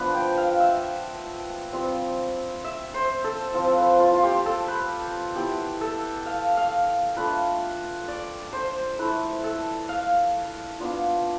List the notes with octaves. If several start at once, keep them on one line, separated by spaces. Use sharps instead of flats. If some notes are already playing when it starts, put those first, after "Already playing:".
Already playing: F3 B3 D4 F4 B4
G5
F5
E5
G3 C4 F4
E5
C5
A4
F3 C4 F4
B4
F4
F4
G4
A4
B4
B3 E4 G4
A4
F5
F5
A3 D4 F4 B4
D5
C5
A3 E4 B4
A4
F5
B3 D4 F4